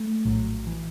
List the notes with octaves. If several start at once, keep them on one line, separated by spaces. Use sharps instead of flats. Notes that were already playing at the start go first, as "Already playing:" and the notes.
Already playing: A3
A#1 A2 F#3
E3